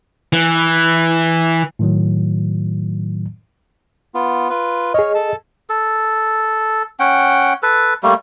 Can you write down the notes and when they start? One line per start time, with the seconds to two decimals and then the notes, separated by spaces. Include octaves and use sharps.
0.33 E3
1.79 A2 D#3 F#3
4.15 B3 F4
4.50 F4 B4
4.94 G#4 C#5 D#5 F6
5.15 A4 A5
5.69 A4
7.00 C#4 F#5 G5
7.63 A4 B4
8.03 G3 A3 A#3